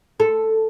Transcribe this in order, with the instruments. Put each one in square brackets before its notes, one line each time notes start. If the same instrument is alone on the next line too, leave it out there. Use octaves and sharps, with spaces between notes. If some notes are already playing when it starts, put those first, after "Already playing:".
[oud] A4